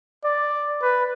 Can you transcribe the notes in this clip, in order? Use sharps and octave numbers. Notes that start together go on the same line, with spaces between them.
D5
B4